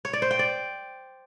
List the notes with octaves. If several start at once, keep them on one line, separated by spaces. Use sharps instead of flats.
C#5
D5
C5
G5
D5